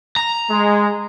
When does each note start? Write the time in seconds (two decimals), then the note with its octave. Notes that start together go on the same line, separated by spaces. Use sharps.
0.16 A#5
0.50 G#3